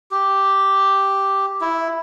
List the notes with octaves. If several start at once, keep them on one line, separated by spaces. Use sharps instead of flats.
G4
E4